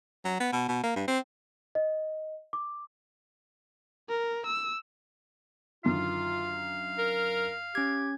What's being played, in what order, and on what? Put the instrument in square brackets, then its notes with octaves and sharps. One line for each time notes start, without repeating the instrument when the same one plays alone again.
[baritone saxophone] F#3
B3
B2
B2
A#3
G2
C4
[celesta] D#5
D6
[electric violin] A#4
E6
[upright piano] F#2 D3 D#3 [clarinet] F4 [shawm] F5
[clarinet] A#4
[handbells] C#4 G#6 [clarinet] G4